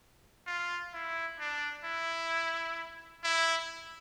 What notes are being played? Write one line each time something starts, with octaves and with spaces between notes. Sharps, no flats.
F4
E4
D4
E4
E4